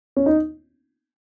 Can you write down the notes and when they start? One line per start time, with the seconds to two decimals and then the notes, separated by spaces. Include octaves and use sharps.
0.17 C#4
0.26 D#4